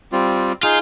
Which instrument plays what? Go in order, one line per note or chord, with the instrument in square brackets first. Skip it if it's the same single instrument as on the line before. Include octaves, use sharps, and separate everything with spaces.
[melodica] G3 C4 F4
[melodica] D#4 G#4 [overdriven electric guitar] F4